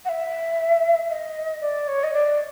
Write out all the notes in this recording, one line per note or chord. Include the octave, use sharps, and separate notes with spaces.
F#5
E5
D#5
D5
C#5
D#5
D5